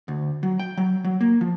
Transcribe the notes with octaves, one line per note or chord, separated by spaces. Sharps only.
D2
F#3
G5
F#3
F#3
A#3
F3